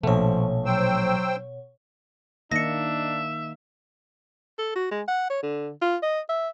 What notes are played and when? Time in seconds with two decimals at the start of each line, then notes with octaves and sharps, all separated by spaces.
0.03 A#1 B2 F3 A3 C#5
0.65 F#3 C5 G5 E6
2.52 D#3 A#3 D4 D#4 E5 A#6 C#7
4.59 A4
4.75 F#4
4.91 G#3
5.08 F#5
5.30 C#5
5.43 D3
5.82 F4
6.03 D#5
6.29 E5